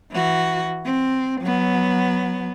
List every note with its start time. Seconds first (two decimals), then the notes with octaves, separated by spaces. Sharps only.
0.12 E3 F#4
0.85 C4
1.41 F#3 B3